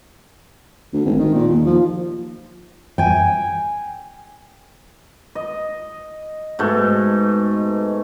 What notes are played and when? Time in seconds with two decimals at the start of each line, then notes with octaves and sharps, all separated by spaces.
0.93 D2
1.05 G#1
1.19 D#3
1.34 A#2
1.48 D#2
1.66 F3
2.98 G5 G#5
5.35 D#5
6.59 G#2 B2 A3